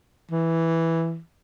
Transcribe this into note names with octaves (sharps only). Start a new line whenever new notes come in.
E3